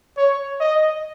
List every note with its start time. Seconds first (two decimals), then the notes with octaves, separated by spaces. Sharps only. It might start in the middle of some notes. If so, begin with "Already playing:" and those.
0.17 C#5
0.60 D#5